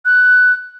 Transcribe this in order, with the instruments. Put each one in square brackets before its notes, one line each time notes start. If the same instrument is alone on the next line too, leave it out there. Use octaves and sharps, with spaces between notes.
[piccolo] F#6